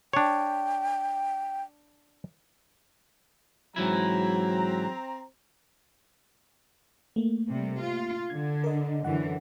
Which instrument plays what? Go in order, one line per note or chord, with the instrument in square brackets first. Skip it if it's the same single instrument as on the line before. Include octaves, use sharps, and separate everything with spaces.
[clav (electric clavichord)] D4 C#5 [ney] G5
[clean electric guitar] G#2 E3 E4 [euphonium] F#3 [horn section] C4 A#5
[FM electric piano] A3 A#3
[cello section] C3 G3
F4
[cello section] D3 [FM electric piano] G#6
[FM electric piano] A#4 D#5
[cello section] F#2 D3 E3 [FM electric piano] F#5